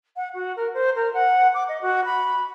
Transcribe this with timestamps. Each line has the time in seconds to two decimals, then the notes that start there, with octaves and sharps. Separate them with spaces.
0.16 F#5
0.34 F#4
0.56 A#4
0.74 C5
0.95 A#4
1.13 F#5
1.54 D6
1.68 D#5
1.81 F#4
2.05 B5